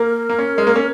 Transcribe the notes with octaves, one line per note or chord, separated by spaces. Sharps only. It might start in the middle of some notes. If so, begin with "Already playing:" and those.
Already playing: A#3 A#4
A#3
C#4
G#3
A#3
C#4